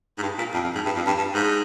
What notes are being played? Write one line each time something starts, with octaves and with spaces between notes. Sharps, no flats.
G#2
G2
A#2
F2
F2
G#2
G2
F2
G2
G2
G#2